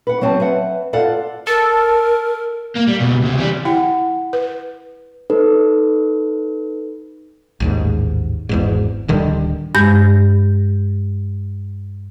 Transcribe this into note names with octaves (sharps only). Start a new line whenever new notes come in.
B4 F#5
F#3 B3 C4 A5
B4 E5 F#5
F4 A4 D5 F5 F#5
A4 A#4
A#3
G3
C#2 B2
D2 C3
E3 G3
E4 F#5 G5
B4
D#4 A4 B4
A1 D#2 G#2
G#1 E2 G#2
D1 D3 D#3 G3
G2 G#3 G6